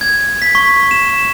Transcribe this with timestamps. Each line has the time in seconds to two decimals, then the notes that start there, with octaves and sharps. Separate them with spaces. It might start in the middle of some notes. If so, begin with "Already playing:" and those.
0.01 G#6
0.42 B6
0.55 C#6
0.91 E7
1.09 E7